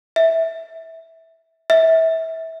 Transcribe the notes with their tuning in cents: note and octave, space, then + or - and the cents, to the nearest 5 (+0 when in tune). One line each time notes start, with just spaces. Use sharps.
E5 -15
E5 -25